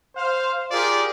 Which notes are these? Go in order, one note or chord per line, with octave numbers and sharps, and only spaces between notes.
C5 F5
F4 G4 G#4 A#4 D5